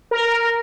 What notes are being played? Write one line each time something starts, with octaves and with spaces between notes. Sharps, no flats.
A#4